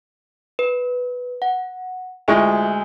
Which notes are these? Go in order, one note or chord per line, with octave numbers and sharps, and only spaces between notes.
B4
F#5
D2 G#3 E4 F4 E5 C#6